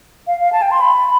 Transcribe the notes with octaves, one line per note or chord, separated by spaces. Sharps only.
F5
F5
A5
G5
C6
B5